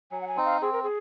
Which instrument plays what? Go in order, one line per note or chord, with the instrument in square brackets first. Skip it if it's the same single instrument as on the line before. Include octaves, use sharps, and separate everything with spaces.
[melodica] F#3 [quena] G#5
[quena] F#5
G#5
[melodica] C4 D#4
[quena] F5
[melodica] C4 [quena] G#4
[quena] A#4
G#4